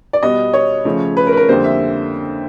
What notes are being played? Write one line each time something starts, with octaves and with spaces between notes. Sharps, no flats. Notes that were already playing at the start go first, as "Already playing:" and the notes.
D5
B2 G3 B3 D#5
C#5
C#3 F3 A3
B4
A#4
B4
A#4
F2 D3 G3 A#3 C5
E5